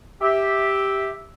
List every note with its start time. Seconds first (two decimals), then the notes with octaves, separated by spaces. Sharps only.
0.22 G4 E5